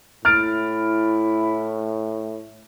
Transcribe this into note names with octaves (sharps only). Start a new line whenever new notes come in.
A2 E4 F6 A6 D7